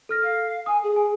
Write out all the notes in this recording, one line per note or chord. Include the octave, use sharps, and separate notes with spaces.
A4 F6 A#6
F5
G#5 D#6
G#4
G#5